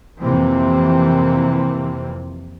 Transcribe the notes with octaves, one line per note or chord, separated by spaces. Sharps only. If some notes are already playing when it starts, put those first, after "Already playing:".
F2 C3 E3 A#3 C4